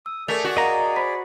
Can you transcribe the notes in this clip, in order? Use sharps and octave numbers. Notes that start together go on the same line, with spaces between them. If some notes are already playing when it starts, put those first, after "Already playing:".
D#6 E6
A3 G#4 A#4 D5 B6 F7
F#4
A#4 D#5 F5 F#5 A#5
C5 B5 B6